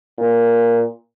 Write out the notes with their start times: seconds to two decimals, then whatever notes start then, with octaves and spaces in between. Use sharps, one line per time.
0.19 A#2